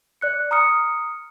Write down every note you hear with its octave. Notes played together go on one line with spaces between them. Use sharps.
D5 F#6 C#7
A#5 D#6 F6 C#7